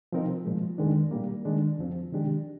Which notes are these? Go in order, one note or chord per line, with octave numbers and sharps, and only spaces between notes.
C3 F3 C4 D#4 A#4
A#2 F3 G#3
F2 D#3 G#3 D4
A#2 G3 A#3
D#3 G#3 D4
F2 D3 F3 C4
C3 D#3 G#3 D4 G4